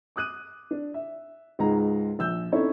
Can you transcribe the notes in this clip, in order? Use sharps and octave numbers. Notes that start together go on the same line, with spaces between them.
D6 D#6 F#6 D#7
D4
E5
C#2 G#2 G#3 A#5
A#1 E6 G6
C4 C#4 D#4 E4 A4 C#5